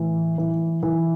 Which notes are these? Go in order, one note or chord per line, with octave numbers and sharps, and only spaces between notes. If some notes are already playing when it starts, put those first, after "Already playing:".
Already playing: A2 E3
E3
E3